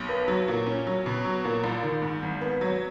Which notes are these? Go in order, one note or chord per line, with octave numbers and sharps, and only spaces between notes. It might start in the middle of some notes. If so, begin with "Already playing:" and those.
Already playing: B1
B3
F#3
A#2
C#4
F#3
B2
F#3
A#2
A#1
D#3
G#2
G#1
B3
F#3